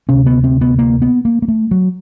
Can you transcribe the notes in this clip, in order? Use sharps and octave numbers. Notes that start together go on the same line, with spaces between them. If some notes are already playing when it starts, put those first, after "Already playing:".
D2 C3 C#4
B3
C4
B3
A#3
B3
A#3
A#3
A3
F#3